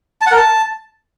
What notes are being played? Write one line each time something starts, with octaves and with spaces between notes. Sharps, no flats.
A5
F#5
A#4
A5